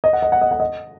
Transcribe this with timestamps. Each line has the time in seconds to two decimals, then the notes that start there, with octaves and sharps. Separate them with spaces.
0.04 D#5
0.13 F#5
0.22 D#5
0.32 F#5
0.42 D#5
0.51 F#5
0.60 D#5